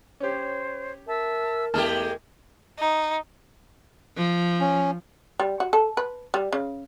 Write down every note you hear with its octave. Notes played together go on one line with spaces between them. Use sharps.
C#4 G4 C5 C#5
A#4 E5 A5 E6
E2 G#3 A3 G4 A5 F6 G#6
D#4
F3
C#4
G3
F#4
A4
B4
G3
C#3